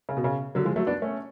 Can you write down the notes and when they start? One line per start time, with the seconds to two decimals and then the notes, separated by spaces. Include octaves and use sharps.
0.09 C#3
0.17 B2
0.24 C#3
0.55 D3 F#3
0.65 F3 G#3
0.76 F#3 A3
0.86 B3 D4
1.02 A3 C#4